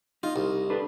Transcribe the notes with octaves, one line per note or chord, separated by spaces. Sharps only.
D#4 F4
C2
D4 A4 B4